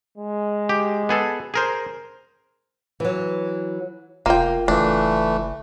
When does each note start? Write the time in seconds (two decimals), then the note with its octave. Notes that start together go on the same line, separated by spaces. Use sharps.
0.18 G#3
0.69 G4
1.09 B3 G#4 A4
1.54 G#4 A#4 C5
3.00 E3 F#3
4.26 F1 A#3 F4 G5
4.68 F#1 E3 A3 D4